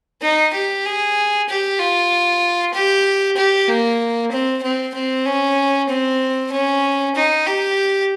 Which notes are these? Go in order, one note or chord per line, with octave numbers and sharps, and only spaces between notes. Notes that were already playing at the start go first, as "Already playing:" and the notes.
D#4
G4
G#4
G4
F4
G4
G4
A#3
C4
C4
C4
C#4
C4
C#4
D#4
G4